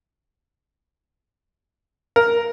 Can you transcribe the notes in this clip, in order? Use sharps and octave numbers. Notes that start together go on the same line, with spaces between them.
A#4